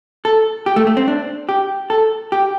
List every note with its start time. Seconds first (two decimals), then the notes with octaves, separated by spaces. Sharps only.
0.25 A4
0.66 G4
0.76 A3
0.87 A3
0.97 C4
1.08 D4
1.49 G4
1.90 A4
2.32 G4